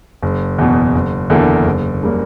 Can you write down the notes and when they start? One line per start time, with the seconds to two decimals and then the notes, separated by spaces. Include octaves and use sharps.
0.22 F#1
0.58 E2 B2
0.95 F#1
1.30 E2 D3 A#3 E4
1.66 F#1
2.03 C#3 G3 A#3